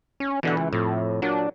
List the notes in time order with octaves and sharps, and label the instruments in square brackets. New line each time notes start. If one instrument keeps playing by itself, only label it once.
[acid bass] C#4
[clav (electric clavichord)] B2 D3 F#5 [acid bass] E3
[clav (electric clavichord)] C#2
[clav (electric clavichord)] F2 [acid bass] A2
[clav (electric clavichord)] A#2 F#3 [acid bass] D4